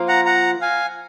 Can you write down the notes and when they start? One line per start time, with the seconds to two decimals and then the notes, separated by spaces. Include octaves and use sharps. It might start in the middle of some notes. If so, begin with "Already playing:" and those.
Already playing: F3 A#3 F4
0.08 F#5 A#5
0.26 F#5 A#5
0.61 F5 G#5